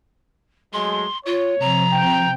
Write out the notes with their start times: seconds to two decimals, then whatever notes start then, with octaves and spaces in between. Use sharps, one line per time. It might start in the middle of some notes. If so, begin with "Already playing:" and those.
0.73 F#3 G#3 A3 C6
1.26 F4 C#5
1.60 C3 F3 A#5
1.93 G5